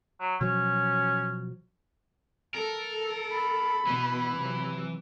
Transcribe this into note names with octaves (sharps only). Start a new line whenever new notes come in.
F#3
B2 F3 F#3 C#4
A4 A#4
B5
B2 E3 B3
C3 F3 F#3